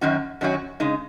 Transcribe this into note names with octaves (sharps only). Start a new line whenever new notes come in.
F#2 D#3 F#3 C#4 F#4
F#2 D#3 F#3 C#4 F#4
C#3 G#3 D#4